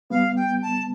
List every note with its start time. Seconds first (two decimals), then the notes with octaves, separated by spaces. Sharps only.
0.10 G3 B3 F5
0.36 G5
0.62 A5